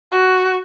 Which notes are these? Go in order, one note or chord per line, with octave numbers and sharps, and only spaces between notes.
F#4